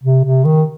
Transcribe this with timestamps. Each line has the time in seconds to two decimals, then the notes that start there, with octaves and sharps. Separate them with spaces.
0.03 C3
0.24 C3
0.45 D#3